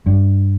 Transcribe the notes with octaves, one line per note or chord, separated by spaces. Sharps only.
G2